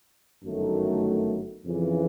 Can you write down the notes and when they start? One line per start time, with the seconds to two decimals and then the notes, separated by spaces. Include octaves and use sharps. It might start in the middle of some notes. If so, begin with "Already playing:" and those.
0.44 G1 F#2 D#3 F#3 A3
1.65 F2 C#3 E3